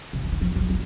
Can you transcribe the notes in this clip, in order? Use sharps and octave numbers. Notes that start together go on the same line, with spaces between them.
C3
C#3
D#3
F3
F#3
F3